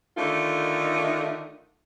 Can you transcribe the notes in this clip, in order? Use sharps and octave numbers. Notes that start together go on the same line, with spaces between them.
D3 D#3 A3 D#4 F4